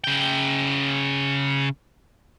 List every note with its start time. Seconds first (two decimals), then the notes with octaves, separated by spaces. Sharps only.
0.04 C#3 G5